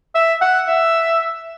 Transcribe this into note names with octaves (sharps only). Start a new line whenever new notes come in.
E5
F#5
E5